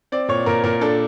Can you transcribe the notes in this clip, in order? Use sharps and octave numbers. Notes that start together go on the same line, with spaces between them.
C4 D5
A#2 C#5
A#2 A#4
A#2 A#4
D4 A4